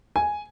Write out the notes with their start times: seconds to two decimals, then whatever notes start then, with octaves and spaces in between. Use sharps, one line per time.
0.16 G#5